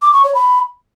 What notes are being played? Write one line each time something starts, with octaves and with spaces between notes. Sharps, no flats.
D6
C#6
C#5
B5